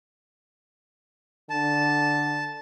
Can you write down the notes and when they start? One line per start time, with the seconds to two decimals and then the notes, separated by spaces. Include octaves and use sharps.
1.50 D3 A5